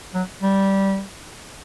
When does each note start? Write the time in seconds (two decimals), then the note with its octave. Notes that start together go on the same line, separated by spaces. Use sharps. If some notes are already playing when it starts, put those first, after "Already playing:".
0.14 F#3
0.43 G3